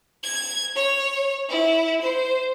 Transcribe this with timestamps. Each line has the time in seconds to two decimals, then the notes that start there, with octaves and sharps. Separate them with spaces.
0.23 G#6
0.76 C#5
1.49 E4
2.01 C5